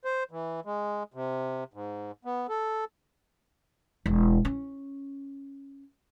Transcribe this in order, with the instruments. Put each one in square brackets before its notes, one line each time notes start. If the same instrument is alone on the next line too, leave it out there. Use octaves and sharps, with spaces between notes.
[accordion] C5
E3
G#3
C3
G#2
B3
A4
[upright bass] E1
C#4